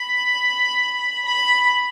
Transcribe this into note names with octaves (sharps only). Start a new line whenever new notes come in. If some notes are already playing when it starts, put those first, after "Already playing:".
Already playing: B5
B5